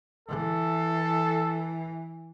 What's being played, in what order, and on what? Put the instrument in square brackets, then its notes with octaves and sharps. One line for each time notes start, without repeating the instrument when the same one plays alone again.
[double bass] E3 [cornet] A4